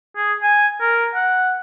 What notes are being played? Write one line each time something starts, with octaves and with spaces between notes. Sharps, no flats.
G#4
G#5
A#4
F#5